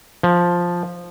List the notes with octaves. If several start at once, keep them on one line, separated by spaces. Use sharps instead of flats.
F3